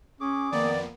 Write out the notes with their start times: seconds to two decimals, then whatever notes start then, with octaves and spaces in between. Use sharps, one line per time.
0.21 C#4 G#4 D6
0.52 F2 D#3 A#3 B3 D5